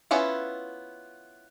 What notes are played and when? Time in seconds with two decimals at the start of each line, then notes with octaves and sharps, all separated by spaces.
0.11 B3 C#4 E4 F4 F#5